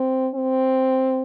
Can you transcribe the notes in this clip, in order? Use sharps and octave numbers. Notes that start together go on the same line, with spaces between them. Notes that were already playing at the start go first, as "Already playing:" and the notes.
Already playing: C4
C4